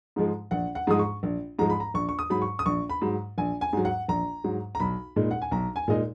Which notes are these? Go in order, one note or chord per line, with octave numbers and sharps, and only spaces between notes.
G#2 F3 G#3
A#1 F#5
F#5
G#2 F3 G#3 D#6
C#6
A#1
G#2 F3 G#3 A#5
B5
A#5
A#1 C#6
C#6
D#6
G#2 F#3 B5
C#6
D#6
A#1 C#6
B5
G#2 F#3
A#1 G#5
G#5
G#2 F#3
F#5
A#1 A#5
G#2 F#3
A#5
B1 B5
A#2 G#3 D#4
F#5
G#5
B1 A#5
G#5
A#2 G#3 D#4 D#5